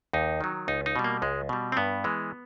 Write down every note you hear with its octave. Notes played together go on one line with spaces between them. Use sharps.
D#2 D#4
D#3 F#3
C#2 D#4
D#4
B2 G3
A#3
C#2 G#3
B2 G3
C4
G2 B3
E3 G#3